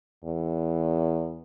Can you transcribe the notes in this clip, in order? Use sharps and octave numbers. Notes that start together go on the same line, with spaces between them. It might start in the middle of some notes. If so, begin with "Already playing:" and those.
E2